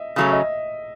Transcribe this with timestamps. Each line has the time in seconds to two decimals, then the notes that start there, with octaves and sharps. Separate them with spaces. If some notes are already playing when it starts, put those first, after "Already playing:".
Already playing: D#5 E5
0.16 C#3 F#3 A3 C#4 E5
0.32 D#5